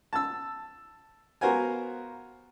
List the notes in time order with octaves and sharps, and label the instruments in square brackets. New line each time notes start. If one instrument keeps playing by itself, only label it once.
[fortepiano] A5 E6
B3 F#4 A#4 C5 F5 G#5